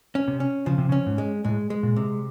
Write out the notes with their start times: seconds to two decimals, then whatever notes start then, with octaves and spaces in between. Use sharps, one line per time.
0.15 C#4
0.28 C3
0.40 C#4
0.66 C#3 F3
0.78 C3
0.89 C#3
0.92 C#4
1.06 G#2
1.18 G#3
1.45 A2 G#3
1.70 G#3
1.83 A#2
1.96 C3